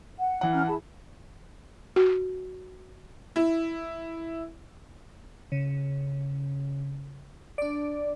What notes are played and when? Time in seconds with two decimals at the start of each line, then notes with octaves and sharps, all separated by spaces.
0.19 F#5
0.41 E3 F#5
0.54 C#4 A#5 F6
0.67 E4 G#4 A5
1.96 F#4
3.36 E4
5.52 C#3
7.58 D4 D5